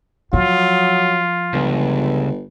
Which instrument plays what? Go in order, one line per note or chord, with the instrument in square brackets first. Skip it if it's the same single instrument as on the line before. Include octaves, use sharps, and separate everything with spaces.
[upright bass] F3 [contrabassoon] F#3 [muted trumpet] F4
[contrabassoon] G1 [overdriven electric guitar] C#2